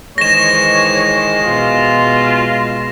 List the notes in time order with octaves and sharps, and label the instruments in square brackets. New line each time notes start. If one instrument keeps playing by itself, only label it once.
[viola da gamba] D#3 E3 C5 [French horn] G#3 [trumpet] C#5 [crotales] A#6 E7
[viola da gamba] B2 [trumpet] F4